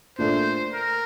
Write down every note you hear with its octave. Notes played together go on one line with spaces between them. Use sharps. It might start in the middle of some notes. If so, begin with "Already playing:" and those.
A#2 A3 D4 A4 C5
A#4